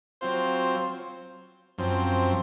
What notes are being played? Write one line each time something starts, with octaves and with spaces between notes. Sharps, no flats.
F#3 C4 F4 C5
F#2 F3 C4